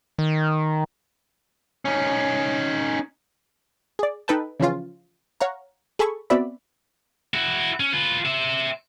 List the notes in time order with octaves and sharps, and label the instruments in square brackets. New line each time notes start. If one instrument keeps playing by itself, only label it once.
[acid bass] D#3
[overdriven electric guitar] C#4 D#4
[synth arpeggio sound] G#4 D5
D#4 A4 B4 G5 A5
C#3 E3 F3 C#4 F4
C#5 F5 F#5 A#5
G#4 A4 G#5 B5 C#6
B3 C4 F#4 D5 E5 B5
[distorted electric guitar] E4 F#4
C#4
F4 B4
C5 E5